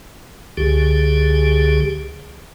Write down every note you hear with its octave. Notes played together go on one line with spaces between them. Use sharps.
C#2 D3 G4 G#4